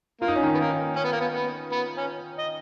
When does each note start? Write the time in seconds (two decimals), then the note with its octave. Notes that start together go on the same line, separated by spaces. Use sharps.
0.21 A#3 F4
0.28 D#4
0.36 C#4
0.43 D#3 D#4
0.55 B3
0.59 A#3
0.96 C#4
1.04 B3
1.12 A#3
1.21 B3
1.34 B3
1.72 B3
1.97 C#4
2.38 D#5